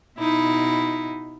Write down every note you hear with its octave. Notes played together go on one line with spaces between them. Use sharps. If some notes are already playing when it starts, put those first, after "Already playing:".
B2 D#4 E4